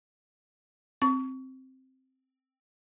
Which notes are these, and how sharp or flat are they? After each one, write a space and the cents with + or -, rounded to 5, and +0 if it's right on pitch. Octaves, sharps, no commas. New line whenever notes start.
C4 +0 C#6 +30